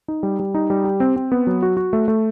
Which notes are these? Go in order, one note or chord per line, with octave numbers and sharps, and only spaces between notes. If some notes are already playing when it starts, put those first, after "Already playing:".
D#4
G3
G3
D#4
G3
G4
C4
C4
B3
F#3
F#4
F#4
A3
A3